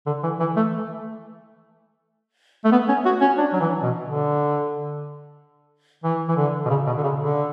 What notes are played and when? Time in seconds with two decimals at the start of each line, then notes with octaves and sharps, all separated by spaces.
0.06 D3
0.23 E3
0.40 E3
0.56 A3
2.65 A3
2.72 B3
2.89 C#4
3.05 F#4
3.21 C#4
3.38 D4
3.53 F#3
3.61 E3
3.83 B2
4.04 D3
6.04 E3
6.28 E3
6.37 D3
6.66 B2
6.70 C#3
6.87 B2
6.98 D3
7.03 C#3
7.20 D3